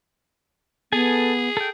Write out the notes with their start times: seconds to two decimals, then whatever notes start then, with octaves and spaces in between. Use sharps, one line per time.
0.93 B3 G#4 A4 G#5
1.57 A4 G5